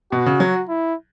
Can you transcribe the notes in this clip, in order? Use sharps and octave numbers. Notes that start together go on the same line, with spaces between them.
B2 F#4
C#3
F#3
E4